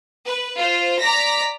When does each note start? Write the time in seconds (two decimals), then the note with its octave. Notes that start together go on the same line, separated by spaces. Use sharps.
0.24 B4
0.56 F4 C5
0.99 D5 A#5 A#6 B6